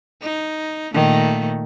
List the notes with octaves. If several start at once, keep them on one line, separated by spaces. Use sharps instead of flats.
D#4
A#2 D#3 A3